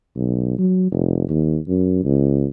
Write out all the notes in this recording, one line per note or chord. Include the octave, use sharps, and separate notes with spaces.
B1
F#3
F1
D#2
F#2
C#2